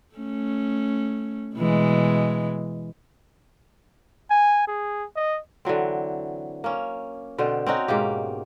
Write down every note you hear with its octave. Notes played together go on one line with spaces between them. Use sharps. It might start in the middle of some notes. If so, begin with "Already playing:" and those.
A3 C#4
B2 E3 G#3
G#5
G#4
D#5
D3 E3 F#3 C4
A#3 C#4
B2 D3 C4 C5
C4 C#4 D#4 F#4
G#2 B2 A#3 G4